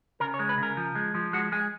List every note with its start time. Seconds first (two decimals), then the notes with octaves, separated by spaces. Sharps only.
0.20 C#3 A#4
0.34 C#5
0.39 G#3
0.49 B4
0.58 C#3 A#4
0.77 F3
0.95 G#3
1.15 F3
1.33 G#3 F#4
1.52 G#3 G#4